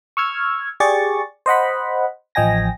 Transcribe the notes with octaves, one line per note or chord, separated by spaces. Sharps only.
C#6 E6 F6 G#6
G4 G#4 D5 C#6 A6
C5 D#5 F#5 B5
A1 F3 D#5 G5 G#5 A#6